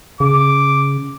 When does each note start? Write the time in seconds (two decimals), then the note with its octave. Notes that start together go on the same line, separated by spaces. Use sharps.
0.20 C#3 D6